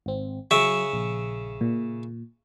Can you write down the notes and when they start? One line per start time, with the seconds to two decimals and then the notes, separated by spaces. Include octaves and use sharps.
0.06 G#1 C4
0.51 C#3 F#3 E5 C#6
0.93 A#1
1.61 A#2